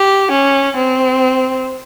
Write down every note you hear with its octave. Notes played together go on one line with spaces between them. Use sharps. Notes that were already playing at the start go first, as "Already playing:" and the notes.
Already playing: G4
C#4
C4